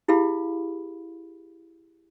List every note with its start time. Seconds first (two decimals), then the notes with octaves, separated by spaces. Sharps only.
0.08 E4 G4 G#4 F5 B5